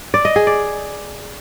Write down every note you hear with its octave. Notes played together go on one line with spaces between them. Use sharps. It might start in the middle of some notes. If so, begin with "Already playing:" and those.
D5
D#5
G#4
D5